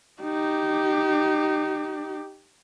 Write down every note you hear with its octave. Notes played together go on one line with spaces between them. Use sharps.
D#4 G4